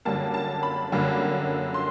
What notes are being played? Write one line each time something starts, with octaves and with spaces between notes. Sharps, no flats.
F#2 D3 G3 A#3 A5
A5
B5
F#2 D3 G3 A#3
C6